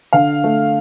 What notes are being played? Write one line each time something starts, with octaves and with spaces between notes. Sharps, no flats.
D3 F5
A3